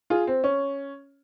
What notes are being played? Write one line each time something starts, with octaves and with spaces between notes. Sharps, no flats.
F4 G#4
C4
C#4